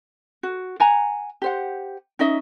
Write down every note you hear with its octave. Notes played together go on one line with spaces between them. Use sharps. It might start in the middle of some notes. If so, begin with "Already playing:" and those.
F#4
F#5 G#5 A#5
G4 C5 F#5
C#4 D#4 D#5 E5